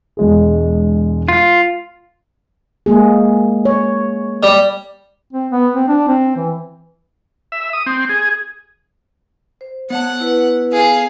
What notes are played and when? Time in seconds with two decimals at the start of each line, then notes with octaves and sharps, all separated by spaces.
0.17 E1 G#3 G#4
1.28 F4
2.86 G#3 A#3 G#4
3.65 C#5
4.43 G3
5.33 C4
5.51 B3
5.75 C4
5.88 D4
6.08 C4
6.36 E3
7.52 E5
7.73 D#6
7.86 C4
8.09 G#4
9.61 C5
9.90 B3 C#5 F#5 A5
10.20 E4 B4
10.72 G#4 F5